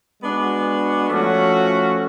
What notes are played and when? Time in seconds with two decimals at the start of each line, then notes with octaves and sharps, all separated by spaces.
0.21 G#3 B3 D4 F#4
1.09 F3 A3 C#4 F#4